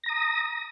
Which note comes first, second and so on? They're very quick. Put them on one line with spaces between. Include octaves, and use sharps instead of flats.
A#6 A#5 D#6